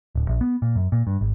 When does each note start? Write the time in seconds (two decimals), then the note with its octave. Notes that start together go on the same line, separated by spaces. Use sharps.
0.15 D1
0.28 A#1
0.41 B3
0.62 A#2
0.76 F#2
0.92 A#2
1.07 G2
1.21 G#1